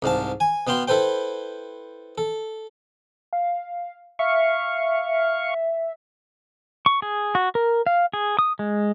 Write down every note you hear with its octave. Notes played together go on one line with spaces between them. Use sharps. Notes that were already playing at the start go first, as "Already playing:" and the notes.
C2 G#2 F5 A5
G#5
B2 B3 F5 G5 C6
E4 A4 B4 C5 G5
A4
F5
E5 F5 C#6
C#6
G#4
F#4
A#4
F5
G#4
D#6
G#3